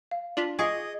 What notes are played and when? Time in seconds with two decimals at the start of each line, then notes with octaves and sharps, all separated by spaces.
0.11 F5
0.37 D4 F4 B6 F#7
0.59 F4 G#4 D#5 C#6 D6